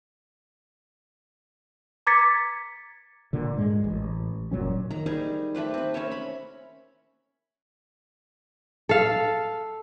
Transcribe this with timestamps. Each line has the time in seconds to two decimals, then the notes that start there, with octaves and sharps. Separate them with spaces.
2.07 A#5 D6 G#6 A6 B6 C#7
3.33 A#2 D3
3.57 G#2 G#3
3.84 A1
4.51 F#1 A#2 F#3 C#4
4.91 D#3 A#5
5.06 G3 D#4 G#4
5.55 A3 G4 B4 C5
5.74 C4 B4
5.94 C#4 A#4 C#5 E5
6.11 B5
8.89 A4 F5